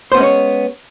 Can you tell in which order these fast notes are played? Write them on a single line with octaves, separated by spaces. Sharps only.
C5 B3 C#4 G#3 C#5